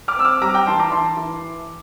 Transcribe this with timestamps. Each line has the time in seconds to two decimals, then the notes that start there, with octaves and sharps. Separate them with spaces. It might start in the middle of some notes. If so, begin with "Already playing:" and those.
0.08 D6 F6
0.16 C4 E6
0.25 D6 F6
0.42 G3 A#5 D6
0.54 G5 A#5
0.67 E3 A5 C6
0.79 A#5 D6
0.92 E3 A5 C6
1.17 E3